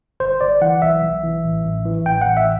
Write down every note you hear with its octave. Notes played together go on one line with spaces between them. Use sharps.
G1 C5
G1 D5
E3 F#5
B1 E5
B1
E3
A1
A1
E3
A1 G5
A1 F#5
E5